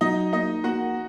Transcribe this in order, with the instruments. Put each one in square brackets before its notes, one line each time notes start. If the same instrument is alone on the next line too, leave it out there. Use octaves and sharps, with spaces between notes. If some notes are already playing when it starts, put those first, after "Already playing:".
[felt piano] F#3 [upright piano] D#4 D#5
[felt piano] A#3 [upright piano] D#4 D#5
[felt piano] A#3 [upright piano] F#4 F#5